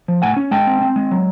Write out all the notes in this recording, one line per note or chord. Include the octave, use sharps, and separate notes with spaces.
F3
A2 F#5 G#5
C#4
G#3 G5 A5
C4
C4
G#3
F#3